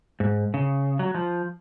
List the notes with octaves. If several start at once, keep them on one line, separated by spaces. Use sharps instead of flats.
G#2
C#3
F#3
F3